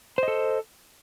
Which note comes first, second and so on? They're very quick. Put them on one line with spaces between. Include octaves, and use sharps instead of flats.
C5 D#5 A4